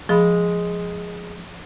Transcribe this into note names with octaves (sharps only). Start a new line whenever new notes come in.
F3 G#3 B5